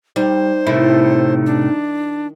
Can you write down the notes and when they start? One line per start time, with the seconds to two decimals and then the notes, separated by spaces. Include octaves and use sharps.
0.16 G3 D#4 C5
0.67 A2 C3 D#3 A3 E4
1.46 D4